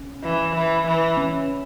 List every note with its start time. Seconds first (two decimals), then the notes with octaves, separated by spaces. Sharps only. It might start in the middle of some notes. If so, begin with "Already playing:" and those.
Already playing: C#4
0.24 E3
0.55 E3
0.86 E3
1.17 C#4